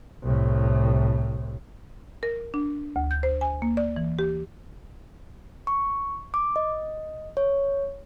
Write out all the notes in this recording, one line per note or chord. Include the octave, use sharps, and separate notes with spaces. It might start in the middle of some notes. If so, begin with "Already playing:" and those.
C2 A2
A#4
D4
D2
G6
C5
G#5
A#3
D5
E3
G4
C#6
D6
D#5
C#5